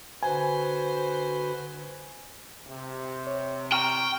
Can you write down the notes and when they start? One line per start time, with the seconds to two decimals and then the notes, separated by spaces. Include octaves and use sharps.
0.22 D3 F#4 B4 C5 G#5
2.67 C3
3.27 C#5
3.72 G5 A#5 C#6 F6